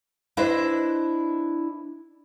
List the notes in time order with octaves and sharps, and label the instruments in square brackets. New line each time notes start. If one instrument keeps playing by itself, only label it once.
[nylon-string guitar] D4 E4 B4 C5 D#5 E5